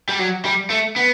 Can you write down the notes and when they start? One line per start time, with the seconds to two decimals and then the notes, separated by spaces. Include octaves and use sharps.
0.09 G3
0.19 F#3
0.45 G3
0.70 A3
0.96 B3